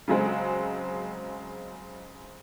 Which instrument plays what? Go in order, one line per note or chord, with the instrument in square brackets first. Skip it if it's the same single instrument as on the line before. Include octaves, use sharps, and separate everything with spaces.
[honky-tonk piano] C#3 F#3 G#3 C4